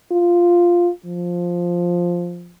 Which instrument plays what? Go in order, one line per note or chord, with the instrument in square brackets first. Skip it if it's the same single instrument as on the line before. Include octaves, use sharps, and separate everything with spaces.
[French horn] F4
F3